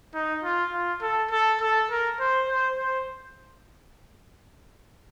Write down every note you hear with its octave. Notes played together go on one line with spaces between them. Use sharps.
D#4
F4
F4
A4
A4
A4
A#4
C5
C5
C5